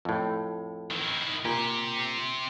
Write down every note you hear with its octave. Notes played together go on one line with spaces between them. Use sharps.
F2 A2
D#3 E4
A#2 C4 G4